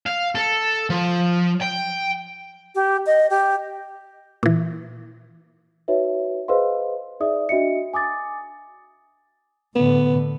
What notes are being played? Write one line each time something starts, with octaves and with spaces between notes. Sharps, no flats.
F5
A4
F3
G5
G4
D#5
G4
A#2 E3
D#4 F#4 B4 C#5 E5
G#4 B4 C5 D#5 F5 C6
D#4 G#4 D5 E5 D#6
D4 F#4 D#5 E5 C#7
G#5 D6 D#6 A6
A2 D3 B3